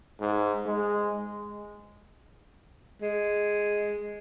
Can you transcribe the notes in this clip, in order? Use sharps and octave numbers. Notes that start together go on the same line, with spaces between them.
G#2
G#3
G#3